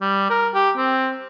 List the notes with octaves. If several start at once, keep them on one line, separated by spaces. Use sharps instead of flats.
G3
A#4
G4
C4